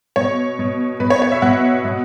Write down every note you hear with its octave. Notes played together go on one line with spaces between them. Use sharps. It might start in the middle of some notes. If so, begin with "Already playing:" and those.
B2 C#5
B2
B2 B4
C#5
C#5
E5
B2 F#5
B2